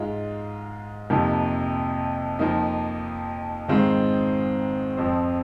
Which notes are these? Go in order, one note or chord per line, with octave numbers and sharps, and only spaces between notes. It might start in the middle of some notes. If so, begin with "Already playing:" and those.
Already playing: G#2 G#3 F4
F2 C3 F3 A#3 D#4
F2 F3 A#3 D#4
G#2 D#3 G#3 C4 F4
F2 F3 C4